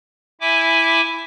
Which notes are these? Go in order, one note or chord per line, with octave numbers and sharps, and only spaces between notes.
E4 E5 G#5 D6